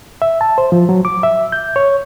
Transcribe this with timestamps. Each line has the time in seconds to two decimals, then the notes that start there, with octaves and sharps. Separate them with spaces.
0.22 E5
0.41 A5
0.58 C5
0.72 F3
0.89 F#3
1.05 D6
1.23 E5
1.52 G6
1.76 C#5